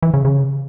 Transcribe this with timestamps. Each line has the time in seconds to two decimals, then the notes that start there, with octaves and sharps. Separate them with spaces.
0.03 E3
0.14 C#3
0.25 C#3